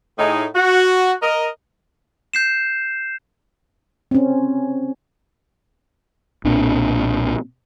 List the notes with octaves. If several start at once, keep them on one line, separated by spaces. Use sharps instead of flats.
A2 D#4 G#4
F#4
A#4 D#5
G6 C7 E7
C4 C#4
B1 A#2 C4 D4